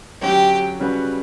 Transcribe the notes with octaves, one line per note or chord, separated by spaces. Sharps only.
D3 F#3 C#4 G4
C#3 G3 C#4 F#4 B4